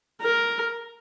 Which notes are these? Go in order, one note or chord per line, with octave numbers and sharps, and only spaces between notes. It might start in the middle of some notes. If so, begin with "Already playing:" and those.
A#4